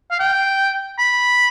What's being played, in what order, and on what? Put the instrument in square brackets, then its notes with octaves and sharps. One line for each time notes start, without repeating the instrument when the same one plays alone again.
[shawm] F5
G5
B5